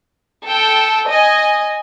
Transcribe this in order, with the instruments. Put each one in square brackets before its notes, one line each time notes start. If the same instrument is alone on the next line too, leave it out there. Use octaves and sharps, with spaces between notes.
[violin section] A4 G5
D#5 G#5